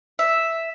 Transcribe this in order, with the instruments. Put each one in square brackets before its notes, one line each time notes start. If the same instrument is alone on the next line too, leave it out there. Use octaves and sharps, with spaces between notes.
[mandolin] E5